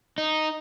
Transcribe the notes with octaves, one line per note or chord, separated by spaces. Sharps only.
D#4